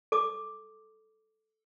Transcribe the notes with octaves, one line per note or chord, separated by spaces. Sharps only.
A4 D6 D#6